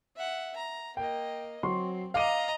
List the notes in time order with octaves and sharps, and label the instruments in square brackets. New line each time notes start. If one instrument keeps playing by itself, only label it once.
[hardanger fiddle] E5 F#5
A#5
[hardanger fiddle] A#3 D#5 [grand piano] G5
[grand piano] F#3 C6 C#6 [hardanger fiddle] C4
[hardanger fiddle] D#5 A#5 [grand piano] F5 D6 D#7